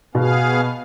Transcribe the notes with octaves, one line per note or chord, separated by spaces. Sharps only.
B2 B3 G#4 F5